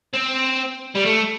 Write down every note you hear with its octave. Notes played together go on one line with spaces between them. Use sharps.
C4
G3
A3